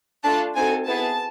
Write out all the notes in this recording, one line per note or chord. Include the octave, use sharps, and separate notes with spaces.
A3 D4 F4 A4 A5
C4 D#4 F#4 A4 G#5
B3 E4 G#4 A5